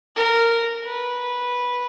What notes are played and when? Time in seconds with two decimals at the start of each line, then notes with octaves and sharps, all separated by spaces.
0.16 A#4
0.84 B4